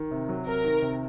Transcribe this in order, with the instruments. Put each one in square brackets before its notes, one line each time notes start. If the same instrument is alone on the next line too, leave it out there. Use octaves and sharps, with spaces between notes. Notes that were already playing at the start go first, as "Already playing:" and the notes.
Already playing: [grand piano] D#3
C3
F#3
[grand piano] C3 [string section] A#4
[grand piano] D#3
C3